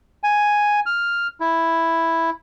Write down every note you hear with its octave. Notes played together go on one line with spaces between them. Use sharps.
G#5
F6
E4